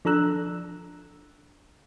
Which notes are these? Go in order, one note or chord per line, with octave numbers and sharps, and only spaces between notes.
F3 D4 A4 A#5 E6 F#6